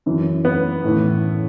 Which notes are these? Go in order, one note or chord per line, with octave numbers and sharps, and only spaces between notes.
F#2 E3
B3
A2 E3